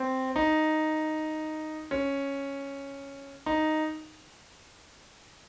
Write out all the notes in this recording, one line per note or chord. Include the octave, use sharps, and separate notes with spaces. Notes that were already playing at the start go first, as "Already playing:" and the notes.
Already playing: C4
D#4
C#4
D#4